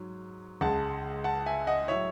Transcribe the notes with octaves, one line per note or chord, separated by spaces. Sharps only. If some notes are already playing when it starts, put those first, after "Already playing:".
Already playing: G#2 F#3
C#2 C#3 G#3 F#5 A5
F#5 A5
E5 G#5
D#5 F#5
A2 F#3 C#5 E5